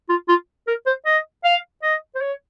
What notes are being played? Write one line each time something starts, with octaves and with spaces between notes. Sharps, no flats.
F4
F4
A#4
C5
D#5
F5
D#5
C5
C#5